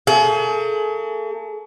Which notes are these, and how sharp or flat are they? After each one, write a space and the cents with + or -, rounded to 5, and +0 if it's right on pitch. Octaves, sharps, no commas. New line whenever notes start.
A3 +45 G#4 +40